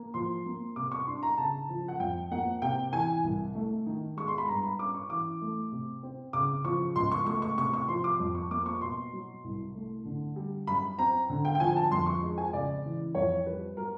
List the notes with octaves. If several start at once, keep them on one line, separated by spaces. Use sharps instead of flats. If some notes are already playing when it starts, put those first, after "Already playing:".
Already playing: A#3
F3 C6
A#3
C3 D6
C#6
D4 C6
A#5
C#3 A5
F3
F#5
F2 G5
A#3 F#5
C3 G5
E3 G#5
C2
A3
D#3
G#3 C#6
C6
B5
G2 A#5
B5
C#4 D6
C#6
E3 D6
A3
C3
C4
C#3 D6
F3 C#6
C#2 C6
C#6
A3 C#6
C#6
C3 C#6
C#6
F3 C6
D6
F2
C#6
A#3 D6
C#6
B2 C6
F#3
C2
A3
D3
G3
F#2 B5
C4 A#5
D3
G5
G5
F3 G#5
A5
F2 C6
C#6
G#3
G#5
C#3 D5
E3
F2 C#5
G3 B4
F#3 A#4